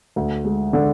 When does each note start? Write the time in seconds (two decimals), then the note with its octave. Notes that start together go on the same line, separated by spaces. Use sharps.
0.16 D2
0.45 G#3
0.73 D3